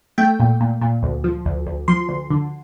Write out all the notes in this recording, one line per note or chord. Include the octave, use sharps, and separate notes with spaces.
A3 G5
A#2
A#2
A#2
D2
F3
D2
D2
F3 C6
D2
D3